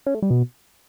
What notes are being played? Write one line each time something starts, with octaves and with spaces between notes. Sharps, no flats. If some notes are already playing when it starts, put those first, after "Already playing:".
C#4
A3
G3
B2